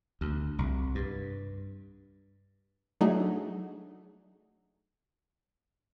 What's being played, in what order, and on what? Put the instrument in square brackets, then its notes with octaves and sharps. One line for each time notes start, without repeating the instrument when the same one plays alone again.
[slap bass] D2
C2
G2
[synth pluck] F#3 A3 D4 D#4 F#4 G#4